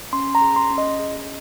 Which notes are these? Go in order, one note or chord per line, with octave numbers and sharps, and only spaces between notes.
C#4 C6
A#5
G#4
C6
C#4
D#5
G#4